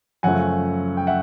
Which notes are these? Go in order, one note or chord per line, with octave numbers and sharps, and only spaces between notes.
F#2 C#3 F3 A3 F#5 G#5
G5
E5 F#5